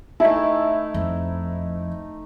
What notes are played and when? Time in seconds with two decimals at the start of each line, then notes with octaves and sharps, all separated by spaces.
0.20 A3 D#4 E4 A5
0.94 F2